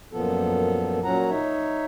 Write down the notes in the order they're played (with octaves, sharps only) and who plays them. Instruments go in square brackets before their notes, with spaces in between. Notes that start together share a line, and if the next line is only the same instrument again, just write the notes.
[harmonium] F#2 A#2 F3 B3 A4
A#2 F#3 C#4 F#5 A#5
D#4 C#5 E5